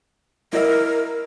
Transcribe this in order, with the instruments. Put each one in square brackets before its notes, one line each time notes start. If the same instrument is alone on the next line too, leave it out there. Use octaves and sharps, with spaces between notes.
[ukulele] E4 D#5 E5 [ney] A#4